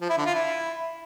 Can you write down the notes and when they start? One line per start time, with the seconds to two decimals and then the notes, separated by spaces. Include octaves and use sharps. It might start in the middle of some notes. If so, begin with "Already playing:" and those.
0.01 F3
0.09 E4
0.18 D3
0.26 F4
0.34 E4